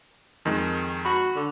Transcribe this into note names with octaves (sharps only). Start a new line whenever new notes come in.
F2 D#3 G#3
F#4 B5
D3